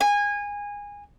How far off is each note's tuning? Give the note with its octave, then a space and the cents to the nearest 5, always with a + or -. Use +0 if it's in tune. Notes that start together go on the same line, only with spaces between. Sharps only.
G#5 -20